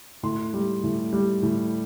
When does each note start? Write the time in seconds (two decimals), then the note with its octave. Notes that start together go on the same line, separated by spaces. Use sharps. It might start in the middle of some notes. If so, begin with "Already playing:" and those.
0.23 A2 C6
0.54 G3
0.83 A2
1.13 G3
1.43 A2